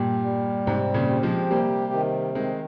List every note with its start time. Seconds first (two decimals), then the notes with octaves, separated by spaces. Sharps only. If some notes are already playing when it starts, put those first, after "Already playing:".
Already playing: G2 A#2 G4
0.24 G3
0.66 G#2 C3 C4
0.94 A#2 C#3
1.09 G4
1.23 F3 G#3
1.51 C3 G3 A#3
1.93 D#3
2.35 D#3 G#3 C4